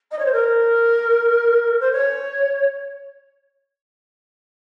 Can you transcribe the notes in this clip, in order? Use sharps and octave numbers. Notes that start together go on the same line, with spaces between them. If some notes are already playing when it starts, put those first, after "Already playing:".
D#5
C#5
C5
A#4
C5
C#5